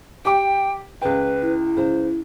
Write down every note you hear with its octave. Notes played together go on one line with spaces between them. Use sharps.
G4 G5 D6
C#2 B4 G5
E4
C#2 C5